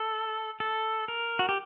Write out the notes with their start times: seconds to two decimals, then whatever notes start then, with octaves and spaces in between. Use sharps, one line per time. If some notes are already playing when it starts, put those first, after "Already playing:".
Already playing: A4
0.60 A4
1.08 A#4
1.39 F#4
1.49 G4